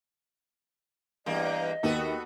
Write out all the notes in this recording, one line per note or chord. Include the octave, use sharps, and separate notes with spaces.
E2 G2 A#3 D#5
D#2 B3 F#4 A4